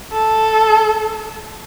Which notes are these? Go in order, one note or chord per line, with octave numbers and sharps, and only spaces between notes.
A4